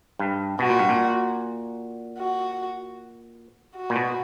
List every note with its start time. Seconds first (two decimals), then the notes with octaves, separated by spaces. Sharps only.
0.19 G2
0.59 B2 F#4
0.69 A#2
0.79 G2
0.89 A#2
2.18 F#4
3.76 F#4
3.90 A#2
3.96 B2